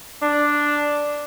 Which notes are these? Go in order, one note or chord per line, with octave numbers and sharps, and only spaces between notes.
D4